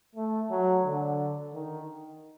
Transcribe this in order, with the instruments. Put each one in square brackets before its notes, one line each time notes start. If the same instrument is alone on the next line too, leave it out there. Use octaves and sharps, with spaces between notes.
[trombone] A3
F#3
D3
D#3